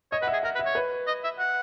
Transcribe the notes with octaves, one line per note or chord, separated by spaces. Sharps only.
C#5 D#5
B4 F#5
E5
G#4
A#4 F#5
B4
E5
C#5
B4
D#5
E5
F#5